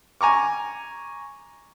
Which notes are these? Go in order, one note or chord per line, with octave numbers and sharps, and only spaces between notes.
G#5 A#5 C#6 D6